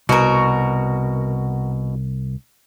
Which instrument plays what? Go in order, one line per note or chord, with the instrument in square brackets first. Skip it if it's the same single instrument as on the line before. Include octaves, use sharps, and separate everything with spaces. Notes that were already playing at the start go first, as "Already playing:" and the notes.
[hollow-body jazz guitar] C2 [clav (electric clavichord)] B2 [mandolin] F#4 A#4